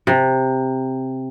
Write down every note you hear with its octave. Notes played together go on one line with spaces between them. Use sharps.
C3